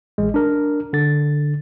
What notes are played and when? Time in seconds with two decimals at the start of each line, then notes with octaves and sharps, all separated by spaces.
0.18 A1 G#3
0.34 D4 A#4
0.93 D3 A6